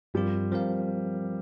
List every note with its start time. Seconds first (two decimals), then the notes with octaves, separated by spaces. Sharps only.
0.14 G2 F3 G3 C4 F4 A#4
0.52 F3 C4 A#4 F5